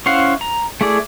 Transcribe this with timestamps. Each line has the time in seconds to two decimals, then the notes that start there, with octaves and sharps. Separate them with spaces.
0.06 C#4 E4 C5 F5 F#5
0.41 A#5
0.81 A3 E4 G#4 D5